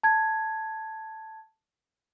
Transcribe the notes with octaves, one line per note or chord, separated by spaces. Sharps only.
A5 G#6